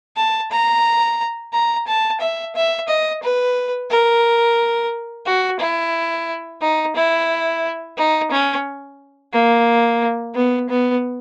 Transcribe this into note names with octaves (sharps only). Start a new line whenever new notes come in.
A5
A#5
A#5
A5
E5
E5
D#5
B4
A#4
F#4
E4
D#4
E4
D#4
C#4
A#3
B3
B3